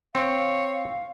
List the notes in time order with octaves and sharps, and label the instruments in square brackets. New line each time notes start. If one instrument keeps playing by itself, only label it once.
[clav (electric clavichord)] C4 [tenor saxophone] C#5 [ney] F5